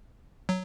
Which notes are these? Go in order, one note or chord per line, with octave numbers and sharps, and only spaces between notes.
F#3